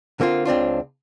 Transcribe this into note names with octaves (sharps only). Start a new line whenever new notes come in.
D3 A#3 C4 F4
C#2 C4 D4 F4